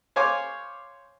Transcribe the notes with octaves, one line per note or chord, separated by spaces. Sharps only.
C5 C#5 F5 G#5 D6